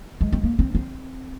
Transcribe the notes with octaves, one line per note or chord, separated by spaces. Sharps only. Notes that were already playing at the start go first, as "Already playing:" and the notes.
G#3
C4
A#3
C4
C4